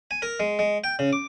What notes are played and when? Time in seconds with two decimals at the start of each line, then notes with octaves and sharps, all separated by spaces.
0.11 G#5
0.22 A#4
0.40 G#3
0.59 G#3
0.84 G5
0.99 C#3
1.13 D6